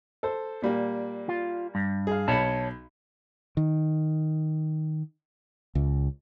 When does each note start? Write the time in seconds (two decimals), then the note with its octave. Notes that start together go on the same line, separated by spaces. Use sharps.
0.23 A4 C5
0.62 A#2 G3 A#3
1.29 F4
1.75 G2
2.07 G#4 F5
2.28 B1 C#5 A5 B5
3.57 D#3
5.75 C#2